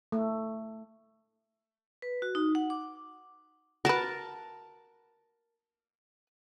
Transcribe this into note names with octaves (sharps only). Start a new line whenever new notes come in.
A3
B4
F#4
D#4
F#5
D6
F#4 A#4 B4 A5